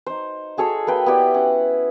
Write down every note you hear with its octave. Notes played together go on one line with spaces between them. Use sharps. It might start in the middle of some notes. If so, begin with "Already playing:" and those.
D#4 C5
F#4 G#4 A4 C#5
A#3 B4 G5
B3 E4 G4 D5
C#4 F#5